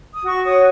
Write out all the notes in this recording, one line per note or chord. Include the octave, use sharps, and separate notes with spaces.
D#6
F#4 C#6
C#5 D#6